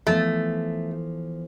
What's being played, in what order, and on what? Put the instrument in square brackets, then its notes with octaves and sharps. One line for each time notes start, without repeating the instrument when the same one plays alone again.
[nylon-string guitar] E3 F3 B3 [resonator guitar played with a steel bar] A3